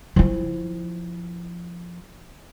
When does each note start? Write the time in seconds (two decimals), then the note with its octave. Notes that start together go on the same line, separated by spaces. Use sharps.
0.16 F3 E4